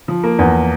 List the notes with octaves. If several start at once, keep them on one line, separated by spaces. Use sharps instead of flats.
F3
A#3
E2